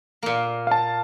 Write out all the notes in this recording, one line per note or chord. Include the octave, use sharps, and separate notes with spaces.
A#2 A#3
F5 A5